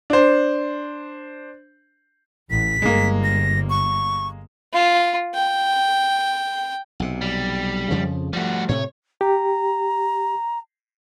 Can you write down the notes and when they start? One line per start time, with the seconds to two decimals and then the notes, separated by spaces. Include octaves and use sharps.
0.10 D4 C5
2.50 A1 B6
2.82 G1 G#3 A#3
3.23 A#6
3.70 C#6
4.73 F4
5.34 G5
7.00 B1 C3
7.21 G3
7.91 F2 C#3 F3
8.33 F3 G3 A3 F#4
8.69 A2 C3 A3 C#5
9.21 G4 A#5